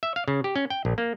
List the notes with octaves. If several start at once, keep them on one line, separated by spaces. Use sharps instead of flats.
E5
F5
C#3
G4
C#4
G5
A#1
A#3